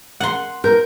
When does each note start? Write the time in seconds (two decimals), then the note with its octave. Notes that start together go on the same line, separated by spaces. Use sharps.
0.20 F#5 C6
0.64 A#4 G6